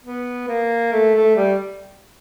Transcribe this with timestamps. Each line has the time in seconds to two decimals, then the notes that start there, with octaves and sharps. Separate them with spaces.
0.05 B3
0.49 A#3
0.93 A3
1.15 A3
1.36 G3